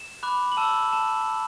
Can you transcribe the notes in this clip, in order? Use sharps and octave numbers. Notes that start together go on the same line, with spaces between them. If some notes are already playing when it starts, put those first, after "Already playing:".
Already playing: E7
B5 D6 F#6
F#7
A5 E6 E7
A5 E7